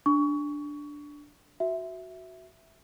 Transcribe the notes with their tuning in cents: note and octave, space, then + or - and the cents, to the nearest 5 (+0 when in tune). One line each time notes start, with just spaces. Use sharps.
D4 +0 C#6 +25
F#4 +0 E5 +0